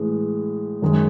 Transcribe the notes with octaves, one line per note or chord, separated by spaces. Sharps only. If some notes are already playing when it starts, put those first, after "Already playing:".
Already playing: A2 E3 G#3
F#2 D#3 G#3